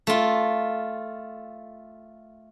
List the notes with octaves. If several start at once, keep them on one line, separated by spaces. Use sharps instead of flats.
A3 F4